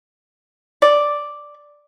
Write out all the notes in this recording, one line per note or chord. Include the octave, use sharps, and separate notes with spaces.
D5